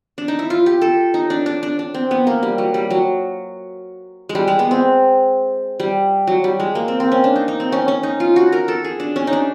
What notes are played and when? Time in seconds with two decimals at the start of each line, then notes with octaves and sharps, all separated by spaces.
0.18 D4
0.28 D#4
0.39 E4
0.50 F4
0.66 G4
0.81 A4
1.14 D#4
1.30 D4
1.46 D4
1.63 D4
1.79 D4
1.94 C4
2.11 B3
2.27 A#3
2.43 G3
2.58 F#3
2.74 G3
2.90 F#3
4.29 G#3
4.35 G3
4.48 G#3
4.59 B3
4.71 C4
5.80 G3
6.27 F#3
6.44 G3
6.60 G#3
6.75 A#3
6.88 C4
7.00 C4
7.12 C#4
7.24 D4
7.36 D#4
7.48 D#4
7.60 C4
7.72 C#4
7.88 C#4
8.03 D#4
8.20 F4
8.36 F#4
8.52 A#4
8.68 A4
8.84 G#4
9.00 D4
9.16 C#4
9.27 D#4
9.33 D4